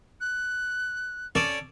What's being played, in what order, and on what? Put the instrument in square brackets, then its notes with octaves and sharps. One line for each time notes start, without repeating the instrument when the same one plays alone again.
[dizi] F#6
[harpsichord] C#4 A4 D5